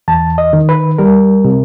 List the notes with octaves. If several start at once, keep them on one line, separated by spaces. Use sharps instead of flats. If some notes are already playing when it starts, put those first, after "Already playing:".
E2 A5
D#5
D#3
B4
G3 A#4
C3